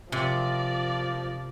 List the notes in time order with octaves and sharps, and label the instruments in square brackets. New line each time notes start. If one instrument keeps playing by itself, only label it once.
[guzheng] C3 [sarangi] F3 [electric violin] A#4 D5